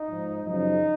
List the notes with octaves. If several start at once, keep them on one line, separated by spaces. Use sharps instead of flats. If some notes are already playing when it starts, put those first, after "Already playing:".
Already playing: D#4
G#2 F3
F#2 C#3 F3 D#4